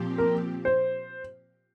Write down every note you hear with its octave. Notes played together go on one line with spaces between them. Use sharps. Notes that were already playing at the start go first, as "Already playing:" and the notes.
Already playing: A#2 F3 C4 G4
A#4
C5